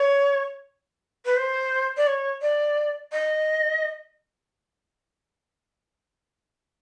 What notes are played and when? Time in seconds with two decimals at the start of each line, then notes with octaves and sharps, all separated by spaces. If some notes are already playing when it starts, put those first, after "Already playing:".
Already playing: C#5
1.26 B4
1.37 C5
1.97 D5
2.07 C#5
2.42 D5
3.12 D#5